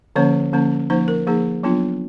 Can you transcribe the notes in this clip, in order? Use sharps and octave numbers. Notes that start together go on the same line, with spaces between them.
D3 F3 A#3 C#4 C#5
D3 F3 A#3 C#4
F3 A#3 D#4 C5
A#4
F3 A#3 D#4 G#4
F#3 B3 D4 F4